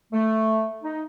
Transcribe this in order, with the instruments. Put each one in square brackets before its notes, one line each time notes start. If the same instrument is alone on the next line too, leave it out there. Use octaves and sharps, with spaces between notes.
[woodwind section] A3
D#4